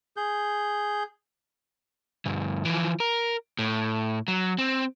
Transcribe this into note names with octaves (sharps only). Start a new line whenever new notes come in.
G#4 G6
D2 G2
E3 F3
A#4
A2
F#3
C4